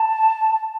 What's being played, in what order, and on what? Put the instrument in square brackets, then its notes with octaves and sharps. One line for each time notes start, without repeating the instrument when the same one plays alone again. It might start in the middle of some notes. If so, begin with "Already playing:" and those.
Already playing: [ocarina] A5